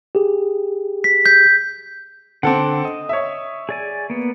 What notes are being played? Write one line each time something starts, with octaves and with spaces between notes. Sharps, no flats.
G4 G#4
B6
G6 B6
D3 C4 A4 F#5 D6
D#5
C#5 E5
G#4 D5 G#5
A#3 B3